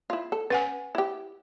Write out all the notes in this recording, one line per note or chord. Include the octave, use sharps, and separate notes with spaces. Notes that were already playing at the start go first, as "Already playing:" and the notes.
E4 F4
A4
C#4 B4 F#5 G#5
E4 G4